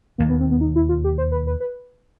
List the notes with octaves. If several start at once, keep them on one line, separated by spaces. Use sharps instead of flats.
E1 D#2 D#3 A#3
B3
C4
B3
D#4
E4
F4
G4
C5
B4
B4
B4